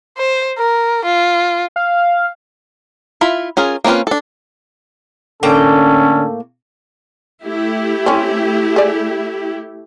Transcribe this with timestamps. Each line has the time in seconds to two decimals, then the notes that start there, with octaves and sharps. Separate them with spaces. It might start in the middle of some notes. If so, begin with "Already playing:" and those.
0.18 C5
0.58 A#4
1.05 F4
1.76 F5
3.21 E4 F4 E5 B5
3.57 C#4 F4 G#4 A#4
3.84 A#3 C4 C#4 F4 B4
4.07 D4 A4
5.43 A2 D3 A#3 C#4 A4 G5
7.44 A3 E4 G4
8.06 C4 C#4
8.76 G#4 D5